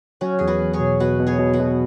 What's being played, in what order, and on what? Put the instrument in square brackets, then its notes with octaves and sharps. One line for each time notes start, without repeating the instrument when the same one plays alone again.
[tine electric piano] F#3 [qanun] C#4 F#4
[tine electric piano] E2 [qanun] G#4
[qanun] F#4 B4
[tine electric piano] E2
[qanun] G#4 C#5
[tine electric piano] B2
[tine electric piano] B2 [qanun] F#4 B4
[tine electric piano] B2
[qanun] G#4 C#5
[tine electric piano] B2
[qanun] F#4 B4
[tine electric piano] B2